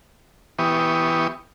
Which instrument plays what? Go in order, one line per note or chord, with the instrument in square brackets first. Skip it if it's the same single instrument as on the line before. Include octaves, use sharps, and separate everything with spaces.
[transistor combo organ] E3 B3 G4 C#6 D#6